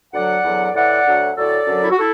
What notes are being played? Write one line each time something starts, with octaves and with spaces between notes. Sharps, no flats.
D2 D3 F#3 D5 F#5
E2 D3 F#3
A2 E3 D5 F#5
D2 D3 F#3
A2 F#3 A4 D5
F#2 D3 F#3
E4
F#4
E4 A4